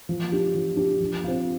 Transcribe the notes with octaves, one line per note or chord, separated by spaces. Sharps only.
F3
D4 G4
F3
D4 G4
F3
C4 F4